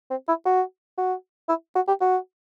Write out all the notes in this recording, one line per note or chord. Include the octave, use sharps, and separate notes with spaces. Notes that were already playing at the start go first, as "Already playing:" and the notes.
C4
E4
F#4
F#4
E4
F#4
G4
F#4